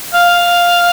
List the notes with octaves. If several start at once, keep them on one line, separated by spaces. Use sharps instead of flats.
F5